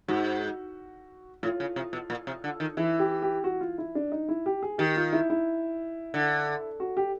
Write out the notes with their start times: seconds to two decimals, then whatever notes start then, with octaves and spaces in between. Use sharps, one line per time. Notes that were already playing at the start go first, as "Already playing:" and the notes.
0.08 G#2 F#4
1.43 A2 F4
1.60 C#3
1.76 C3
1.93 B2
2.10 A#2
2.27 C3
2.44 D3
2.60 D#3
2.77 E3 E4
2.99 G4
3.22 G4
3.44 F#4
3.61 F4
3.78 E4
3.95 D4
4.12 D#4
4.29 E4
4.46 G4
4.62 G#4
4.78 D#3 G4
4.96 F4
5.13 E4
5.30 E4
6.14 D3
6.80 F#4
6.97 G4